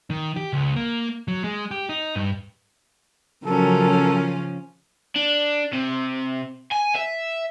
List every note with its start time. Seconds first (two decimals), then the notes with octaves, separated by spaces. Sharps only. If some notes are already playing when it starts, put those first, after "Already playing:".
0.10 D#3
0.36 G4
0.53 C#2
0.76 A#3
1.28 F#3
1.44 G#3
1.71 G4
1.89 D#4
2.16 G2
3.46 C#3 F3 F#3 C#4 A4 A#4
5.16 D4
5.73 C3
6.71 G#5
6.95 E5